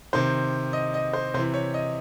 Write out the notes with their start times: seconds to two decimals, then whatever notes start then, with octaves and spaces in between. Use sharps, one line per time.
0.13 C3 D#3 C5
0.73 D#5
0.94 D#5
1.13 C5
1.34 C3 C5
1.39 E3
1.54 C#5
1.74 D#5